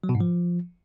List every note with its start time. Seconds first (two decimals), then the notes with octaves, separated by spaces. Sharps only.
0.04 F#3
0.09 B2
0.15 G#2
0.21 F3